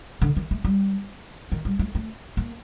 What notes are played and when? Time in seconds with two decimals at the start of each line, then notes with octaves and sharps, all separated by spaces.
0.22 D3
0.37 D#3
0.51 A3
0.65 G3
1.52 D#3
1.65 G3
1.79 A3
1.95 A3
2.37 A#3